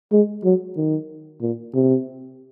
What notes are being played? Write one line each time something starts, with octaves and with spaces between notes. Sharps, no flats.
G#3
F#3
D#3
A#2
C3